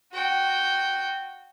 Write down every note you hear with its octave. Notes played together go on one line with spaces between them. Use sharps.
F#4 G5